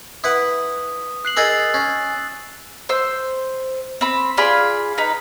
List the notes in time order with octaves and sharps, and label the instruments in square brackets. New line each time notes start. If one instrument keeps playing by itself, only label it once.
[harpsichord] E4 B4 F#5 [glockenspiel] D#6
[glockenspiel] F#6 C7 F#7
[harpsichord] D#4 G#4 A#4 [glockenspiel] E6 A6
[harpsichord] C#4
[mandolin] C5 E6
C4 B5
F4 G#4 D5 B5
D#4 B4 B5